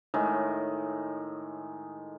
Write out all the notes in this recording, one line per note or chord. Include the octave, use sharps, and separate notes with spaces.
A2 D#3 G#3